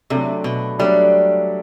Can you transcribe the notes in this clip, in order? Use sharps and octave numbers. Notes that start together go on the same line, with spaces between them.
C3 F#3 A3 D4 A4 D5
B2
F#3 G3 A3 D4 A4 D5